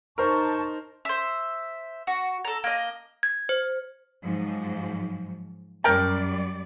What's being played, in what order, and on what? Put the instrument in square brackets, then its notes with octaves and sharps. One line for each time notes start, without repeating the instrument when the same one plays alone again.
[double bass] D#4 [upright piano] A#4 C5 [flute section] A5 C#6
[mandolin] C5 E5
F#4
A4 A#5
A#3 D#5
[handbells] G#6
C5
[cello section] G#2 F3 F#3
[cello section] F#2 G3 D5 [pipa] A#4 G5 A5